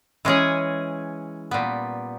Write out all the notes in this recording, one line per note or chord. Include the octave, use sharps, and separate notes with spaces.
E3 G#3 C#4 G#4
A#2 G3 B3